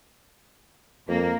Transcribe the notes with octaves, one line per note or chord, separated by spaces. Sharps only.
F2 A#3